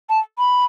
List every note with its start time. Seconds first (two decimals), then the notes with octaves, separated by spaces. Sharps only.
0.09 A5
0.39 B5